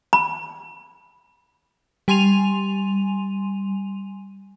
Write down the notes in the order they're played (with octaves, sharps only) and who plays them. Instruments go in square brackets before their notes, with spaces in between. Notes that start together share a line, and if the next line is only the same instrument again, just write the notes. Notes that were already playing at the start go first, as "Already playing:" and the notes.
[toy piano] B5
[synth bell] G3 G#5 C6 D#7 F7